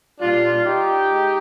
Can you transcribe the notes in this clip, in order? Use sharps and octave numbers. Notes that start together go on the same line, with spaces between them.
A#2 G3 D4 F4
D#4 G4
G#3